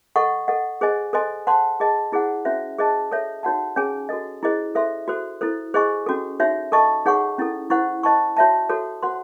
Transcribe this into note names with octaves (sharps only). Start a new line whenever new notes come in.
A4 D#5 F#5 C#6
A4 D#5 F#5
G#4 C5 D#5 G#5
A4 C5 D#5 G#5 C6
C5 F#5 A5 C6
G#4 D#5 A5
E4 G#4 C5 F#5
C#4 F#4 C5 E5
G#4 C5 D#5 A5
A4 C#5 E5
D#4 F#4 C#5 F#5 A5
C#4 G#4 C#5 G#5
F#4 A4 D#5
E4 G#4 C5 D#5
A4 C5 E5 C6
F#4 A4 C5
E4 A4 C5
G#4 C5 D#5 G#5 C#6
C#4 F#4 A4
D#4 F#4 C#5 E5
A4 D#5 A5 C#6
D#4 G#4 C#5 F#5 C#6
C#4 E4 A4
E4 C5 F#5 C#6
C5 D#5 A5 C#6
F#4 C#5 E5 A5
F#4 A4 C#5
F#4 C5 F#5 C6